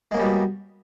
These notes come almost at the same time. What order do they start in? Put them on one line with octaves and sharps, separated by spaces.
G#3 A#3 C#4 G3 B2